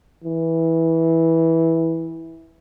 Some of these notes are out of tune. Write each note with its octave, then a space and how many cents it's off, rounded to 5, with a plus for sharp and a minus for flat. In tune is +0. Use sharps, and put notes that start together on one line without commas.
E3 -10